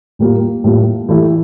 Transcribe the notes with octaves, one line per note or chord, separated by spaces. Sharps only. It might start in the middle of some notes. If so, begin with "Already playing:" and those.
A2 G3 A#3 F4
A2 G3 A#3 F4
E3 A3 E4 G4